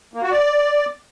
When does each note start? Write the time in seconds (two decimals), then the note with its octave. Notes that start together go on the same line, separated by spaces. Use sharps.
0.14 A#3
0.23 F#4
0.32 D5